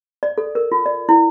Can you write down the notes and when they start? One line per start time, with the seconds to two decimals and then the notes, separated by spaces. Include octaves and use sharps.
0.23 D5
0.38 A4
0.55 A#4
0.72 F4
0.86 D5
1.09 E4